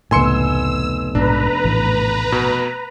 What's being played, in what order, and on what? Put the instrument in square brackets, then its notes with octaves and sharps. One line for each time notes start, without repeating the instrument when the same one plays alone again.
[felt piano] F1 B3 [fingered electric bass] C#2 A2 [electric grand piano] G#5 C6 C#7 [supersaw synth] E6
[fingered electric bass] A#1 G#2 B2 [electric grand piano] D4 [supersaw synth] B4 A#5
[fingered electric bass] A#1 A2 E3
[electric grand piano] B2